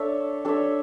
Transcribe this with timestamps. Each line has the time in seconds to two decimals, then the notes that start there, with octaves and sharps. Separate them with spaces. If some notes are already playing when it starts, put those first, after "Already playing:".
Already playing: D4 A4 C#5 E5
0.45 D4 A4 C#5 E5